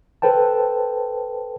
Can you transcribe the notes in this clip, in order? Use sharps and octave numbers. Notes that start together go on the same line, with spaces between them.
A4 B4 C5 G5 A5